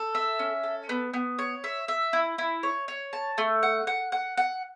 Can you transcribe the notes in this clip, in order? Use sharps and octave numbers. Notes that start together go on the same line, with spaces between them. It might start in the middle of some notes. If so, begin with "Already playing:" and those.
Already playing: A4
E5
C#4
A4
B3
B3
C#5
E5
E5
E4
E4
C#5
C#5
A5
A3
F#5
F#5
F#5
F#5